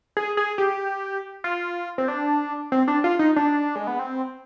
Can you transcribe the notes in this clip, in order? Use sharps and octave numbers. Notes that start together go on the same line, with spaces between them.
G#4
G#4
G4
F4
C4
D4
C4
D4
F4
D#4
D4
G#3
B3
C4